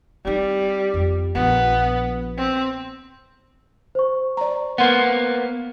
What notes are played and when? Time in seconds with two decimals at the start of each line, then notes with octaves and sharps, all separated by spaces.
0.25 G3 C4 D#4
0.94 F2 C4
1.35 A#1 F3 B3
2.38 C4
3.95 C5 C#6
4.37 D5 A#5
4.78 A#3 B3 F#5 C6